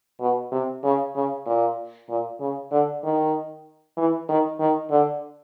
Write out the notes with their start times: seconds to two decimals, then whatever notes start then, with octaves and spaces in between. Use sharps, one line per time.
0.20 B2
0.52 C3
0.84 C#3
1.15 C#3
1.47 A#2
2.09 A#2
2.40 C#3
2.71 D3
3.04 D#3
3.97 E3
4.29 D#3
4.60 D#3
4.91 D3